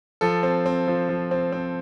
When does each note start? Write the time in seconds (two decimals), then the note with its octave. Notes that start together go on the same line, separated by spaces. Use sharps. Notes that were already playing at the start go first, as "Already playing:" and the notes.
0.21 F3 A4
0.43 C4
0.66 C4
0.88 F3
1.09 F3
1.31 C4
1.52 C4